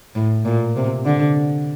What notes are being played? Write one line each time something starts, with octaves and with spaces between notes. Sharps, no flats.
A2
A#2
C3
D3